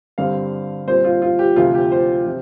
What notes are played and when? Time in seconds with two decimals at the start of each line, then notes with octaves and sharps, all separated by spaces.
0.18 G2 D3 G3 C4 F5
0.87 A#2 G3 C4 C5
1.05 F4
1.22 F4
1.39 G4
1.56 D2 C3 F3 F4
1.74 G4
1.92 C5
2.26 C3 F3